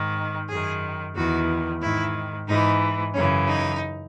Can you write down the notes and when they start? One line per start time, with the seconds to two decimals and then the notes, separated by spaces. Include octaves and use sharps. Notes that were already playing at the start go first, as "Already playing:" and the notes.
Already playing: G#2 D#3
0.48 F#2 D#3 G#4
1.15 E2 D#3 F#4
1.81 G#2 D#3 E4
2.47 G#2 E3 D#4
3.13 F#2 C#3 E3 C#4
3.47 D#4